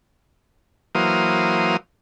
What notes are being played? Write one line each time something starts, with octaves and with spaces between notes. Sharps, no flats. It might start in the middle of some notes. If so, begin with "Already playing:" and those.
E3 F#3 A#3 C5 F5 D#6